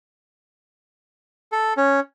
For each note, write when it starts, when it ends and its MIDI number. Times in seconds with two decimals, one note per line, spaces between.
1.52 1.73 69
1.77 2.00 61